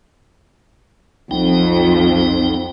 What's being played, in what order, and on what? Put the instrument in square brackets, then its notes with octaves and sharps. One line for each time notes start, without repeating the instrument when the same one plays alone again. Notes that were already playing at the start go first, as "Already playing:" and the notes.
[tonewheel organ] B1 D#4 G5 [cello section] F2